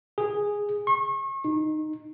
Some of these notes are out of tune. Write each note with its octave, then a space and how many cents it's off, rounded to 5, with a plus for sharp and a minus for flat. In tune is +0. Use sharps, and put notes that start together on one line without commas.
G#4 -10
C#6 -35
D#4 -10